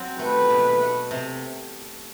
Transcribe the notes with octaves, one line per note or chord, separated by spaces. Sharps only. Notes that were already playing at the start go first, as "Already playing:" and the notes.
Already playing: F#3 C4
A3 B4
B2
A3
C3